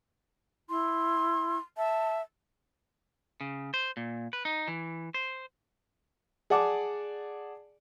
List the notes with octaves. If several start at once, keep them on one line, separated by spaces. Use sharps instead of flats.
E4 C6
E5 A5
C#3
C5
A#2
B4
D#4
E3
C5
G#4 D5 F#5 A5 D6